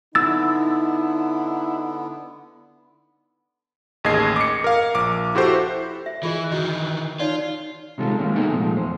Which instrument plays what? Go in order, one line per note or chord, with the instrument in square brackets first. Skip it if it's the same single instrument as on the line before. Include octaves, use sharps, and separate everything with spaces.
[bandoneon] D3 B3 [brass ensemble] D#4 [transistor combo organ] E4 [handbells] E6 A6
[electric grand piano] A1 D#2 G#4 D#5 G#6 C7
D6 C#7
A#4 F5
A#1 D6
E4 F#4 G4 A4 C5
[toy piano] E5
[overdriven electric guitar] E3 [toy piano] F4 G#4 D#5
[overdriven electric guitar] D#3 E3 [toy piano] E4 F#4 D#5
[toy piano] D#4 C#5 D5 [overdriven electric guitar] F4
[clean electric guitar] C3 D#3 G3 G#3 F4 A4
D#3 G#3 A#3 C#4 F4
B3 D#4 E4 G#4 A4 B4
C2 A#2 F3 G#3 A3
E2 C5